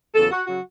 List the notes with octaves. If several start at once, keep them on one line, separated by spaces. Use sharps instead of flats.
E2 C#3 F#3 A4
F#4
C#3 F#3 F#4